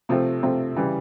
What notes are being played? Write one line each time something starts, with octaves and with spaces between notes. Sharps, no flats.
C3 F3 A3 C4
C3 F3 A3 C4
C#3 E3 G3